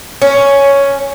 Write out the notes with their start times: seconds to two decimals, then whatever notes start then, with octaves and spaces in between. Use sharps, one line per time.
0.22 C#4